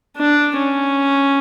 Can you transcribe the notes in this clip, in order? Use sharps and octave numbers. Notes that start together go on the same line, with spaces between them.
D4
C#4